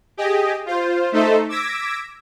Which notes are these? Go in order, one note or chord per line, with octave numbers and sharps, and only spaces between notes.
G4 G#4 D#5
F4 C5
A3 D#4 A4 C5 E5
D6 E6 G#6 A#6 B6 D7